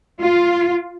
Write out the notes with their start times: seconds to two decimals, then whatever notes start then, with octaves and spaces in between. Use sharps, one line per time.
0.22 F4